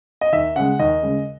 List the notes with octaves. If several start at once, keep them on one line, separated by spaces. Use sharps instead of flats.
D#5
D#2 E5
C#3 G#3 F#5
D#2 D#5
C#3 G#3